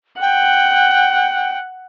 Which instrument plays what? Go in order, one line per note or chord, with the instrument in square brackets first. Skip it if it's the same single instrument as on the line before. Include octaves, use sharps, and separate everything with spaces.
[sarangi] F#5 [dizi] G5